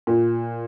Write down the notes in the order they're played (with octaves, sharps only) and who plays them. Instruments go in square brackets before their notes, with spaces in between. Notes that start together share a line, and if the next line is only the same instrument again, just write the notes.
[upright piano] A#2